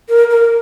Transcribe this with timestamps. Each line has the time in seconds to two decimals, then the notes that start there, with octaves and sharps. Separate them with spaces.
0.09 A#4
0.30 A#4